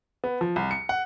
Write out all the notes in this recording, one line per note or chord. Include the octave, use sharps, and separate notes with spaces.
B3
F3
C2
C#7
F#5